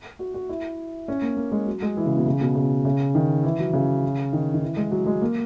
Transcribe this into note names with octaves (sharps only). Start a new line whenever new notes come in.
F#4
F#4
E4
C#4
A#3
A#3
G#3
F#3
G#3
E3
C#3
B2
C#3
B2
C#3
C#3
D#3
E3
F#3
C#3
D#3
D#3
E3
G#3
F#3
G#3
A#3